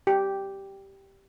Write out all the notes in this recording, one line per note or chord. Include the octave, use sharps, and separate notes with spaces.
G4